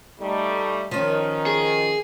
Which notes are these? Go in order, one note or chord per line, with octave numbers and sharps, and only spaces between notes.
G3 A3 D#4
D#3 F3 C#4
G#4